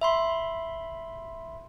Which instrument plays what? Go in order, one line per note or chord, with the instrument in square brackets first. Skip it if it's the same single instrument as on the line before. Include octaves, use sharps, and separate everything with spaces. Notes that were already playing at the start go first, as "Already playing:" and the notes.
[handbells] E5 B5 C6